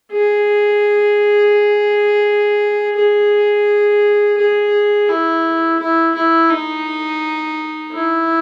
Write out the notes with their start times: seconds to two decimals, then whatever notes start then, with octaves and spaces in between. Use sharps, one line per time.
0.12 G#4
2.96 G#4
4.38 G#4
5.08 E4
5.80 E4
6.15 E4
6.50 D#4
7.92 E4